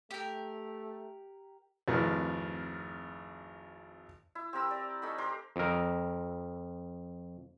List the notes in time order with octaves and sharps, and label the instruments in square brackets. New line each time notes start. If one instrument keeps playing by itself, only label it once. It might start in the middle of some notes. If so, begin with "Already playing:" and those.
[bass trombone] A3 [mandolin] G4 A#4
[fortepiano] G#1 F2 A2 A#4 B4
[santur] E4
C4 G4 A#4 E6
D5
A3 D#4 G#5 B5
G4 A#4 C5 D6
[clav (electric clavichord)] F2 A#4